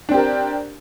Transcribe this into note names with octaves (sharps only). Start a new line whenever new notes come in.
C4 D4 G4 A#4